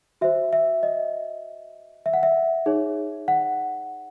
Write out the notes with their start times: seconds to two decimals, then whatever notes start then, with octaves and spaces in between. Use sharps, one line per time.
0.21 F#4 C5 E5
0.53 E5
0.83 D#5
2.06 E5
2.13 F#5
2.23 E5
2.66 D#4 G#4 C#5
3.28 F#5